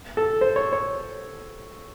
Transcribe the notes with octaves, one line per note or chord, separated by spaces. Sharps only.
A4
C5
C#5
C#5